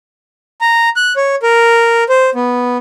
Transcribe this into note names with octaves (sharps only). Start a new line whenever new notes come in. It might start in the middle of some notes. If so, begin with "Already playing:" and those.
A#5
F#6
C#5
A#4
C5
B3